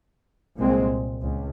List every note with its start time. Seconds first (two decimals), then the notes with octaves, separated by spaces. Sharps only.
0.57 C2 A#2 G#3 C4
1.22 C#2